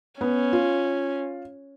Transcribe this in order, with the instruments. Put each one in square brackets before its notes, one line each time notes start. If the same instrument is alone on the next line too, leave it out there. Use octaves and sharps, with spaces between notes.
[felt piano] B3 [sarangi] C#4
[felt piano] F4